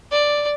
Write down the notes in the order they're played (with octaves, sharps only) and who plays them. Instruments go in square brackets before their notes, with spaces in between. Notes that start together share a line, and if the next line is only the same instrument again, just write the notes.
[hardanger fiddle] D5